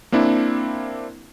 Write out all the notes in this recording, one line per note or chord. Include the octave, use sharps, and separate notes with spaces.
A#3 C4 D4 E4